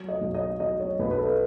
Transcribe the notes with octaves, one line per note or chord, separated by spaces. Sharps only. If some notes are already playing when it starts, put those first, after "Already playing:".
Already playing: F#3 C#5
D#5
B1
D#5
F#3 D#5
C#5
B1 B4
B4
A4